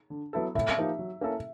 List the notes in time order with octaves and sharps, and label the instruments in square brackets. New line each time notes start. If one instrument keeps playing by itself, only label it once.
[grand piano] D3
F#3 B3 E4 A4
[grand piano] A2 [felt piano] E5
[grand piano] F3 A#3 D#4 G4
F#3
A#3 C#4 E4 A4